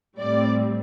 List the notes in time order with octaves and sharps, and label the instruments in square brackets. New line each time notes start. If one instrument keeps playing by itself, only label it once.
[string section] A2 G3 C4 D5